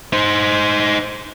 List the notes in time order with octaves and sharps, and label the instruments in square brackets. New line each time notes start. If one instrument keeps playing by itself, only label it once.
[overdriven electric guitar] D#4 C5